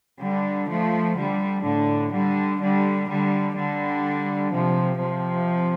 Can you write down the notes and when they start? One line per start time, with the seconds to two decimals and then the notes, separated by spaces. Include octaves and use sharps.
0.21 D3 G3
0.70 F3 A3
1.17 D3 G3
1.66 A2 D3
2.13 D3 G3
2.61 D3 G3
3.10 D3 G3
3.58 D3 G3
4.54 C3 F3
5.02 C3 F3